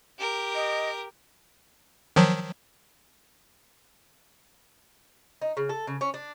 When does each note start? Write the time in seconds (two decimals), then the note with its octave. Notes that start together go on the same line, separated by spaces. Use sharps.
0.19 G4 A#4
0.55 D#5
2.16 D#3 F3 F#3
5.42 D#4
5.57 C#3
5.69 A4
5.87 C#3
6.01 C#4
6.14 D4